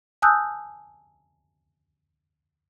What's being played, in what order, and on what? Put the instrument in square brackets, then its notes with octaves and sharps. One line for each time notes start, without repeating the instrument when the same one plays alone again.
[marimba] G#5 A5 D#6 E6 F#6 G6